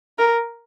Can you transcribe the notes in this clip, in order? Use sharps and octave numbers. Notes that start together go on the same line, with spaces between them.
A#4